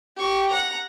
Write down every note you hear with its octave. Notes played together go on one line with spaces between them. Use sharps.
G4 C#6
F#5 A#5